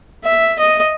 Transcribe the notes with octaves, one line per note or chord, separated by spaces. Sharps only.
E5
D#5